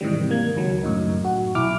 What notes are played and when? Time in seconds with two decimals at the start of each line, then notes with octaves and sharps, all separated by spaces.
0.01 G#2 C3 D#3 E3 G3
0.31 A#3 G#6
0.56 C#2 D#3 F#3
0.83 F#2 A2 D#4
1.25 F#4
1.55 B1 E4 D6 F6